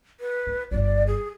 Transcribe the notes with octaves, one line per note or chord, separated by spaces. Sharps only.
B4
E4
G1 F4 D5
G#4